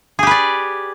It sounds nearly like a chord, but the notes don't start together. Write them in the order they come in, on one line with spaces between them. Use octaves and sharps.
G#4 G4 B4 D5